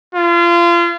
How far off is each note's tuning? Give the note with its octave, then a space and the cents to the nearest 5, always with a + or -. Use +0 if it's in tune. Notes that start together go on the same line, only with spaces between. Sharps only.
F4 -30